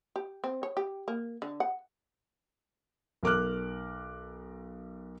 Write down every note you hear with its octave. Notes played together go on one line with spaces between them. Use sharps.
G4
C4
C#5
G4
A#3
D3
F#5
B1 A#4 D6 F6 F#6